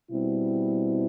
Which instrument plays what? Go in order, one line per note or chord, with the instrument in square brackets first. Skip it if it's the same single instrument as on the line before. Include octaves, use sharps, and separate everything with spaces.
[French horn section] B2 G3 C4 E4